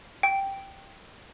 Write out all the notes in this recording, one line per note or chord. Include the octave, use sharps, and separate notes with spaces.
G5